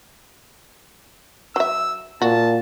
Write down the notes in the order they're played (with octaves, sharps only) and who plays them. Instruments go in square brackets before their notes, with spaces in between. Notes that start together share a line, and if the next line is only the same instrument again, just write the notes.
[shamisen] F#3 E5 [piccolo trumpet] E6
[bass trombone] A#2 [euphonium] F4 [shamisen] F#4 [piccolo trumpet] A5